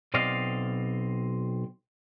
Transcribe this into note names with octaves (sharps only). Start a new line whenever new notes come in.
B1 B2 C4 D5 D#5 F5